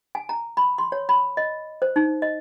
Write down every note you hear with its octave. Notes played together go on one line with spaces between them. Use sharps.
G#5
A#5
B5
C6
C#5
B5
D#5
C5
D#4
D#5